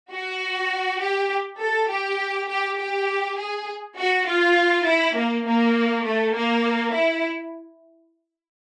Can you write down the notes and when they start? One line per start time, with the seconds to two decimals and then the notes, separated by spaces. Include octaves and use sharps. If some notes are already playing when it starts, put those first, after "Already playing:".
0.11 F#4
1.01 G4
1.60 A4
1.89 G4
2.49 G4
2.78 G4
3.38 G#4
3.97 F#4
4.27 F4
4.85 E4
5.16 A#3
5.45 A#3
6.05 A3
6.34 A#3
6.94 E4